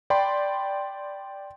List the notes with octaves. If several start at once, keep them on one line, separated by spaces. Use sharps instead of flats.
D5 G5 B5 C6